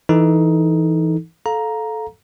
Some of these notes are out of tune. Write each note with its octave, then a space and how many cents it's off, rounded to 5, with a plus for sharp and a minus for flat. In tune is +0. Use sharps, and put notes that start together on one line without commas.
E3 +0 D#4 +15 A4 +0
A4 -15 F5 +15 A#5 +5